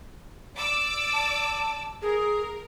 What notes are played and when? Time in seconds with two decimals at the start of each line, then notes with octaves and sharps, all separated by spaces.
0.57 D5 D6 E6
1.13 A5
2.02 G#4 A#4